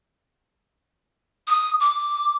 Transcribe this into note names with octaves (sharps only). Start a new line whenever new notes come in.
D#6
D6